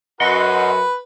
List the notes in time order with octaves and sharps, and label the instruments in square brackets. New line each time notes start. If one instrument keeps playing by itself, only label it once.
[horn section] F#2 F#4 [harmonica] B4 [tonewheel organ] D#5 F#5 C6